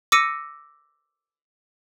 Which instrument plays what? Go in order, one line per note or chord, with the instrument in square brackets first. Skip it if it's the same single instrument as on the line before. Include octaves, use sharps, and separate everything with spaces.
[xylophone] D6 E6 A#6 C#7 D#7